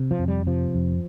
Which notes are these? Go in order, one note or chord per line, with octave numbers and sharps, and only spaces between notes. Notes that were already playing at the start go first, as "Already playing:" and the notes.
Already playing: C3
F3
F2
G3
C3 F3
F2